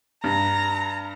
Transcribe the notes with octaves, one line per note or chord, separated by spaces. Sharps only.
G2 A#5